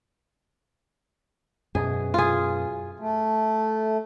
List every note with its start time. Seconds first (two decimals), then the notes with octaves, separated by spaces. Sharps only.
1.75 F#2 B2 G#4
2.14 F4 G#4
2.99 A3